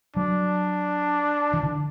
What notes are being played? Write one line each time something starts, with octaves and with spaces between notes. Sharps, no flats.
F#3 D4
E3
D3